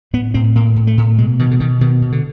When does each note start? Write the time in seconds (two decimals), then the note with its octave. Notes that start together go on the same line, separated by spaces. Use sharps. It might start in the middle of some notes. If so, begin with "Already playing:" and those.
0.13 A2 B3
0.34 A2 C4
0.55 A2 A#3
0.76 A2
0.87 A3
0.97 A2
1.18 B2 G#3
1.39 B2 D#3
1.51 D3
1.60 B2 D#3
1.81 B2 D#3
2.02 B2
2.12 D3